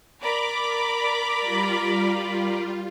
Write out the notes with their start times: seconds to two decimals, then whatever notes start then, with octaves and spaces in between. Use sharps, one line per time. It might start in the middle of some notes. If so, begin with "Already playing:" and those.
0.22 A#4 D5 B5 D6
1.41 G3 F4